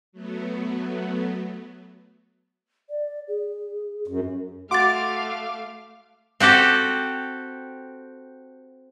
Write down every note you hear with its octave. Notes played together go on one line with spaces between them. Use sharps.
F#3 A3 B3
D5
G#4
F#2
A3 F#4 F5 C6 D6 A6
C4 F#4 G4 A4